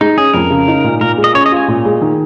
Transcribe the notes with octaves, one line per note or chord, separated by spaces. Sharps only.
G#3 D#4
C#4 G#4
F2 A#4
C#3
D#4
A#2
A#2 A#4
G#3
D#5
C#4 C#5
D#5
F4 G#5
A#2
G#3
D#3